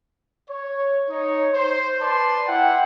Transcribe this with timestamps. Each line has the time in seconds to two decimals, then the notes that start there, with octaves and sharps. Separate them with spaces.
0.50 C#5
1.10 D#4 C#5
1.53 C5
2.01 B4 D5 A5 C6
2.47 E4 F#5 G5